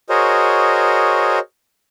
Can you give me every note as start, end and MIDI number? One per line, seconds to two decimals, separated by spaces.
0.09 1.39 66
0.09 1.39 68
0.09 1.39 70
0.09 1.39 72
0.09 1.39 73
0.09 1.39 75